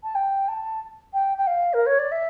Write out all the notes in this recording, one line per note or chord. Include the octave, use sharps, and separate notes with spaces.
A5
G5
A5
G5
G5
F5
A#4
C#5
D5
E5